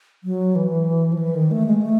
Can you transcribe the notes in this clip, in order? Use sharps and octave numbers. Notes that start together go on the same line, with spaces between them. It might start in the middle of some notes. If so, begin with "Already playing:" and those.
F#3
E3
F3
E3
D#3
A3
G#3
A3